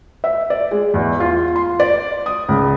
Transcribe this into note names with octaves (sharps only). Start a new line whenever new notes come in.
E5
D5
G#3
E2
F4
C6
D5
D#6
C#2